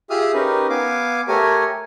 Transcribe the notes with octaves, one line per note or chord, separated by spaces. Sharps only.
F4 G4 G#4 E5 D#6 F6
C#4 D#4 G4 A#4 B4
B3 F5 G#5 D6
A3 G4 A#4 C#5 G#5